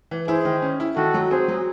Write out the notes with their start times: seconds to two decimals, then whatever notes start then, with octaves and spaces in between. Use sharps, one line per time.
0.11 E3
0.28 E4 G#4 C5
0.45 D#3
0.62 C#4
0.80 E4
0.97 D#3 F#4 A4
1.14 F#3
1.31 C4 G#4 C5
1.48 F#3